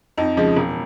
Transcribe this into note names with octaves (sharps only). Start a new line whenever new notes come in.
F2 D#4
C#3 F3 G#3
E1